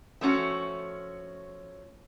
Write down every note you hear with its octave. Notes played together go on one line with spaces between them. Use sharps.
F3 A3 C#4 F#4